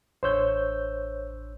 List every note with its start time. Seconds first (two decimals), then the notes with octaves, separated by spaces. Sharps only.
0.23 A1 D4 C5 C#5 E6 G6